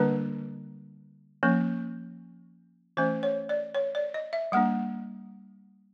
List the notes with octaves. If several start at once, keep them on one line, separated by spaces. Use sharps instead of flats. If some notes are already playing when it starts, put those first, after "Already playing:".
Already playing: D3 G3 A#3 D4 B4
F3 A#3 C#4
E3 A3 C#4 C5
C#5
D5
C#5
D5
D#5
E5
G3 A#3 D4 F#5